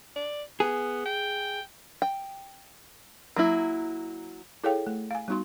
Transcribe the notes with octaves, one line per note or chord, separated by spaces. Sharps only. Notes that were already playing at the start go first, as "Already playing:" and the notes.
D5
B3 G#4
G5
G5
F#3 A#3 E4
E4 G#4 A4 C#5 F5 G5
A3
F5 G#5
G3 B3 D#4 F#4 C6